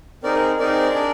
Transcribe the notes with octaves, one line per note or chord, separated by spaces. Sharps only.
C4 D#4 G#4 A#4 D5
A#4
C4 D#4 G#4 A#4 D5
D4 G#4